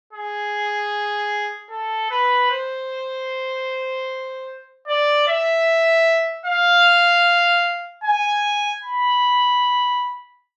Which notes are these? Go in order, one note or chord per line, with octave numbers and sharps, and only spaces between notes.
G#4
A4
B4
C5
D5
E5
F5
G#5
B5